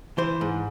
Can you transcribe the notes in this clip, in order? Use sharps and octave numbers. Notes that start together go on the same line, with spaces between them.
E3 C5
G#2